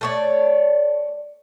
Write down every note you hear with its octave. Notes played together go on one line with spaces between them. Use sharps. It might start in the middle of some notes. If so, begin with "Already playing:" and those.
A3 C#5 D5